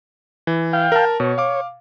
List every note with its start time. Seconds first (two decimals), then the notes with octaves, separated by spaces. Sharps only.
0.47 E3
0.73 F5 G5
0.92 A#4 A5
1.20 B2 C#5
1.38 F5 D6